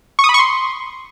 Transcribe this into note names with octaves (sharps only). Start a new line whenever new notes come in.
C#6
D#6
B5
C#6
C6